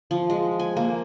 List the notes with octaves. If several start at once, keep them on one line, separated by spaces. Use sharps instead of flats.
F3
G#3
G#5
A#3